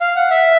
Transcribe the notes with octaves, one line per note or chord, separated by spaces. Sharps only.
F5
F#5
E5